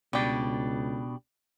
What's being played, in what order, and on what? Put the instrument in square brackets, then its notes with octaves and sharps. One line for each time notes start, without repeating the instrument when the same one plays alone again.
[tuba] C#2 [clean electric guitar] B2 D4 [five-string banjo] G3 G4